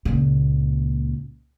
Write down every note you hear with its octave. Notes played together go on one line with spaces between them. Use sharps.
C#2 A#2